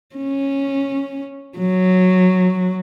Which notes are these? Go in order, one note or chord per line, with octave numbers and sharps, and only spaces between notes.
C#4
F#3